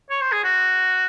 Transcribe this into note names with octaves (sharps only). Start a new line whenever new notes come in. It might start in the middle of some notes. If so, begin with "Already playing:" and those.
C#5
C5
G#4
F#4